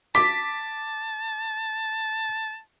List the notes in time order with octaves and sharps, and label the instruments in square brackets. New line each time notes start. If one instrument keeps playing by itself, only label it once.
[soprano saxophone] A5 [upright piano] D6 [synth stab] B6